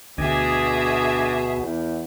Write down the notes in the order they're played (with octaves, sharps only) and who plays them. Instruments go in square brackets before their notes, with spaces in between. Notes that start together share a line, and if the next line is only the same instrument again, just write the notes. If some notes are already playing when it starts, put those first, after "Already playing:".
[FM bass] D2 [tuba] B2 [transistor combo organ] D4 D#5 G#5 [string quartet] G#4 E5
[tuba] E2